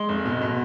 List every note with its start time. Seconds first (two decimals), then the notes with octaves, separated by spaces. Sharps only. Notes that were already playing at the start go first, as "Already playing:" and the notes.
Already playing: G#3 C6
0.09 F1
0.25 B2
0.41 B2